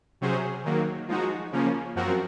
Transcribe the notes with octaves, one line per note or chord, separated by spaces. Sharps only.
C3 F#3 C#4 G#4 C5
D#3 F#3 A#3
F3 G#3 D#4 F#4
C#3 F3 A#3 C#4
F#2 F3 C4 F#4 A#4